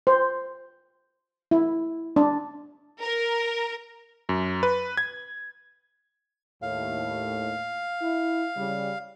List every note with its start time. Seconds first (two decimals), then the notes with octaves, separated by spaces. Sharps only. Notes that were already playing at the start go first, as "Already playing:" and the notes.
0.07 C5
1.51 E4
2.16 D4
3.01 A#4
4.29 F#2
4.63 B4
4.97 G#6
6.62 D#2 A2 F5
8.01 E4
8.57 C#3 G3